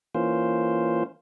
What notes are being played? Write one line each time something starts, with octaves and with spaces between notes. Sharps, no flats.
E3 A#3 C#4 F4 C5